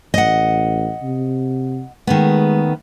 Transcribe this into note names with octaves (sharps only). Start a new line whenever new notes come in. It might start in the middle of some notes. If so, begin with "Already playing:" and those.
A1 D#5 F#5
C3
D#3 G#3 A3 B3